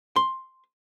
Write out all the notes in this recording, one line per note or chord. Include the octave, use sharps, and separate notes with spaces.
C6